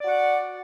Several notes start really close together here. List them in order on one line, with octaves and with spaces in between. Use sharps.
D5 F#4 F#5